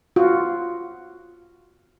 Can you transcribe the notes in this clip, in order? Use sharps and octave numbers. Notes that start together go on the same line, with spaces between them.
F4 F#4